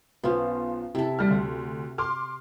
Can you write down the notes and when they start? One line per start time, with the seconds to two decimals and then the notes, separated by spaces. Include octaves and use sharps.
0.24 B1 B3 C#4 F4 C5
0.95 C3 E4 A4
1.19 G3 F6
1.30 D2
1.98 C6 D6 F6